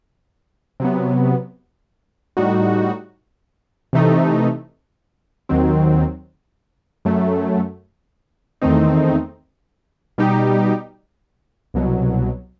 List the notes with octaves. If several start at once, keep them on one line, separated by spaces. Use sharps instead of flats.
C3 F#3 B3
A2 G3 D#4 F#4
C3 E3 A3 D#4
D#2 D#3 F#3 C4
F#2 F#3 A3
E2 D#3 A3 C4 D#4
B2 G3 D#4 G4
C2 B2 F#3